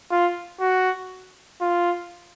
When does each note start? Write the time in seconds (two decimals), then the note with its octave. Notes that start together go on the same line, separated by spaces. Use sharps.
0.11 F4
0.61 F#4
1.61 F4